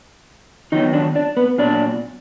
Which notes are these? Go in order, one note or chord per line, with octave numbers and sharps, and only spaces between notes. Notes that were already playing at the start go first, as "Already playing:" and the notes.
D#3 F#3 B3 D#4 D#5
D4 D5
D4 D5
B3 B4
A#2 F#3 B3 D4 D5